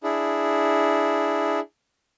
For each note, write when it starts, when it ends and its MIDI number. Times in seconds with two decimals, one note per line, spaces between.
0.03 1.60 62
0.03 1.60 64
0.03 1.60 68